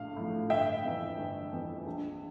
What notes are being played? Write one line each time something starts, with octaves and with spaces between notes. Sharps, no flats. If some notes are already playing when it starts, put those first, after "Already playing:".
Already playing: A#1 A2 F5
A2 F3
G1 E5 G5
F2 E3
G1
F2 E3
A#1